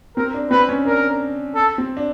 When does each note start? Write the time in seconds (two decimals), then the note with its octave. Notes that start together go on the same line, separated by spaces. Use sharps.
0.17 C4 A#4
0.34 D4
0.51 C4 B4
0.69 C#4
0.85 D4 A#4
1.55 A4
1.78 C4
1.97 D4